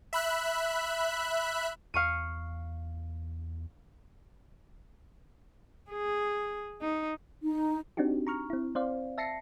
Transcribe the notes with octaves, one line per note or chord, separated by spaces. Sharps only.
E5 B5 F#6
E2 F5 C#6 D#7
G#4
D#4
D#4
C4 D4 D#4 F#4 G4
A#5 C#6 F6
C4 E4
C4 C5 D5 F5
E5 A5 A#6 C7 C#7